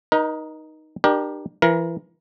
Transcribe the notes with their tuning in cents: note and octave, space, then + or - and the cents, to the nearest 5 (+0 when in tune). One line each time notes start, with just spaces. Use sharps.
D#4 +0 A#4 +45
D4 +40 G4 +0 A#4 +30
E3 +30 A#4 +25